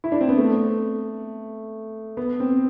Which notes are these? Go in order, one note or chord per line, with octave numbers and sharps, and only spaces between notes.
E4
D4
C4
B3
A3
B3
C4